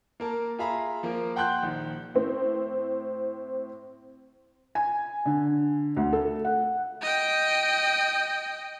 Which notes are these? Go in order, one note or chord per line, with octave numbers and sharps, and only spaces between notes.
A#3 A#4 A5
F4 G#4 E5 F5 A#5 B5
F3 A#3 A#4
F#5 G5 A5 C6 F#6 G6
A#1 D#3
A2 C4
G#5
D3
D2
A4
F#5
D#5 G5